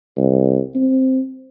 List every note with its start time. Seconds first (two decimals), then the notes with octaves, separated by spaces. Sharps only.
0.17 C2
0.75 C4